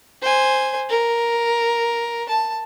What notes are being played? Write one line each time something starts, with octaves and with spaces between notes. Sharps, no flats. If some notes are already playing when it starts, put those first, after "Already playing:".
C5 G#5
A#4
A5